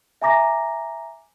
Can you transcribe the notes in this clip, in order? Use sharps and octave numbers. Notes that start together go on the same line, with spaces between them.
E5 G#5 A#5 D6 A#6